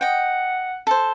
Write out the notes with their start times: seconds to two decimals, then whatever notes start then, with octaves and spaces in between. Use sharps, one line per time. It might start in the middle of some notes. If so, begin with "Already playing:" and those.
0.01 D#5 F#5 G5
0.87 A4 C5